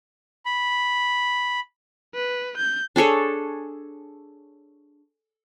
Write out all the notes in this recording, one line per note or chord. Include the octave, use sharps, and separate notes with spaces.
B5
B4
G6
D4 G#4 A4 C#5